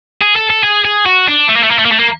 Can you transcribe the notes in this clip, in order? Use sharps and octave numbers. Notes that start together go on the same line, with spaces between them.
G#4
A4
A4
G#4
G#4
F#4
D4
A3
A#3
A3
A#3
A3
A#3
A3
A#3